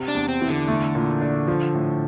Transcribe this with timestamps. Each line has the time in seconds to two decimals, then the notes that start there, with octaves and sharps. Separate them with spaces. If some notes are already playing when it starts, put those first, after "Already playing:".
Already playing: C3
0.08 D4
0.15 E2
0.28 C4
0.41 E3
0.48 D3
0.68 A3
0.95 A#2
1.21 D4
1.47 F3
1.74 A2